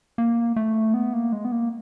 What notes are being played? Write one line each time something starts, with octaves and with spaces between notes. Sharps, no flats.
A#3
A3
B3
A#3
G#3
B3
A#3